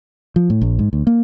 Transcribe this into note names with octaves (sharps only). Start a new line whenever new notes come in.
F3
A2
A#1
G#2
D2
A#3